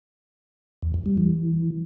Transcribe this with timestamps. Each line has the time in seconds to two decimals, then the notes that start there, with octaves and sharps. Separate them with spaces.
0.82 E2
0.94 F2
1.06 G3
1.17 E3